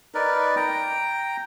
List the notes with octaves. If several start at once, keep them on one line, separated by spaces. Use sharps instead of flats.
D#4 A#4 B4 D5
G5 A#5